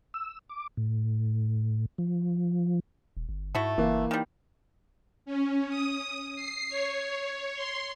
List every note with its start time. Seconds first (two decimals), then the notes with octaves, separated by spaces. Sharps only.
0.14 E6
0.49 D6
0.77 A2
1.98 F3
3.17 D#1
3.29 G1
3.55 G#2 A3 E4 F#4
3.78 F#1 E3 A#3
4.11 D#3 G3
5.26 C#4
5.69 D#6
6.36 C7
6.69 C#5
7.56 C6